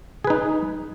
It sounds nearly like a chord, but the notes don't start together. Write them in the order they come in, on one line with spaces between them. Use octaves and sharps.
G#4 B4 D#4